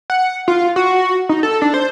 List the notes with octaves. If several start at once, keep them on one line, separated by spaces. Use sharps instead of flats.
F#5
F4
F#4
D#4
A4
D4
C5